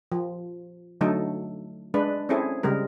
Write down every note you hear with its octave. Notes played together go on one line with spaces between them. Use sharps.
F3
D3 F#3 A3 D#4 A4
G#3 D4 B4
C4 C#4 E4 G#4 A4
C#3 G3 G#3 A#4